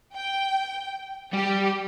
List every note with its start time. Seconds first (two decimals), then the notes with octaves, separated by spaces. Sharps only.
0.15 G5
1.33 G3 G4